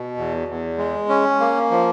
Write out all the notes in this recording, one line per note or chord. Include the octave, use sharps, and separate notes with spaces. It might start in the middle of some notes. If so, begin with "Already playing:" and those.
Already playing: B2
E2
E2
G#3
C#4
A#3
F3